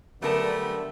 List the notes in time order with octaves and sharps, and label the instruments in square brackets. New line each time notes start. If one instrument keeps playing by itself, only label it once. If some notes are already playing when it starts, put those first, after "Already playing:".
[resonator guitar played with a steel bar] F#2 A#4 A5 [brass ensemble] D3 [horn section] G3 A3 B3